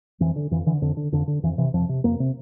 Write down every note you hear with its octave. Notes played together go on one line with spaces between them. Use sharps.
F2 E3
D3
F2 E3
D3 E3
F2 D3
D3
F2 D3
D3
F2 E3
C3 E3
F2 F3
C3
F2 A#3
C3